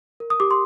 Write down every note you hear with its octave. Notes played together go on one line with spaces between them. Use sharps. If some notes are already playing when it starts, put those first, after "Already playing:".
A#4
D#6
G4 D6
C6